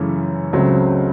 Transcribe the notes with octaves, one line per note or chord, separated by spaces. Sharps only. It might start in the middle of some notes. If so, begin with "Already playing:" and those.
Already playing: F#2 C#3 E3 A3 C#4
C#2 C#3 F#3 A3 C4